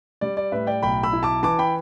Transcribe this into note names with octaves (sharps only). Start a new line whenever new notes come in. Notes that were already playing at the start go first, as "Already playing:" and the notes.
G3 D5
D5
A2 B4 E5
D5 G5
B1 G5 B5
B5 E6
E4
A5 D6
E3 A5 D6
G5 B5